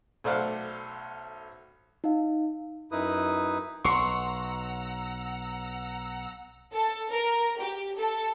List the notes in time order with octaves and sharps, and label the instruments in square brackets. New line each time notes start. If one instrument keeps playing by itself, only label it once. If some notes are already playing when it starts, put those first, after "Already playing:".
[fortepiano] B1 A3 C5 D5 F5 F#5
[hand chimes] D#4 F5
[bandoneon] F#2 D#4 E4 B4 D#6
[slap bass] B1 [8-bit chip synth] F#5 A#5 E6 [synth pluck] C6 C#6
[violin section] A4
A#4
G4
A4